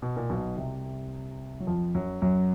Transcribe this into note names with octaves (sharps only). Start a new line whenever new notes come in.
B2
A#2
B1 B2
C2 C3
F#3
F2 F3
F#2 F#3
F#2 F#3